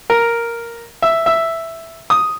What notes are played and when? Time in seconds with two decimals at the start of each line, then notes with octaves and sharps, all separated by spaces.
0.10 A#4
1.02 E5
1.26 E5
2.10 D#6